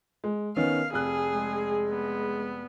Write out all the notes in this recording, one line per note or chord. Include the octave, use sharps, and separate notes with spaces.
G#3
D#3 B3 C#4 F5
F1 G#4 F#6
G#3
B3